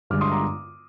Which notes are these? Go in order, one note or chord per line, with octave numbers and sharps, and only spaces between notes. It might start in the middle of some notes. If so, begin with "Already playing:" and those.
G2 D3 G#3 D6 F6
C6 D#6
A#5 D6